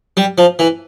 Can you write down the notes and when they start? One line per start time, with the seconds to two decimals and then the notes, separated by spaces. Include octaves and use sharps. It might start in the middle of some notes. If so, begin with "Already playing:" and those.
0.17 G3
0.38 F3
0.59 E3